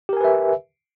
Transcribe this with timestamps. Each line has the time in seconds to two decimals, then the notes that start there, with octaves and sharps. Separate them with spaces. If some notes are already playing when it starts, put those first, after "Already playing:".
0.09 G4
0.13 A#4
0.17 G#5
0.21 B4
0.24 E5